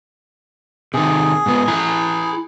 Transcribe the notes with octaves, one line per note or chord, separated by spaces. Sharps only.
C3 D#3 G#4
G#2 B3
E4 G#5 A#5